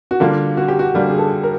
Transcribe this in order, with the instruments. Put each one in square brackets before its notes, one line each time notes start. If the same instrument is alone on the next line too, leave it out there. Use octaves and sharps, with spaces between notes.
[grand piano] F#4
[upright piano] D3 G3 A#3 D4 [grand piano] F4
[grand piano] F#4
G4
F#4
[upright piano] D3 G3 A#3 D4
[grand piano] G#4
A4
A#4